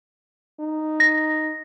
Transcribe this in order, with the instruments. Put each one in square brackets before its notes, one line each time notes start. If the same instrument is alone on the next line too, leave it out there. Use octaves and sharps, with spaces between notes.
[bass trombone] D#4
[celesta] A#6